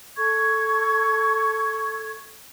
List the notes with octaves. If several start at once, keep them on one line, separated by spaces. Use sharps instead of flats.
A4 C#6 G#6